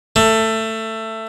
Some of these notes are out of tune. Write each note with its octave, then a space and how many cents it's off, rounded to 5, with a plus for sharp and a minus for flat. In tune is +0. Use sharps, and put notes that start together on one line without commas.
A3 +15